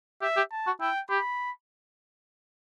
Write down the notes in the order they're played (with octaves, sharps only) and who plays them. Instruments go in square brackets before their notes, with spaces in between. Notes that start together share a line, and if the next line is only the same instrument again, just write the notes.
[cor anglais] G4 [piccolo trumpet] E5
[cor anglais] G4
[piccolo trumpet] A5
[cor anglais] F#4
[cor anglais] E4 [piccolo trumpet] G5
[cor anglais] G4 [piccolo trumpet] B5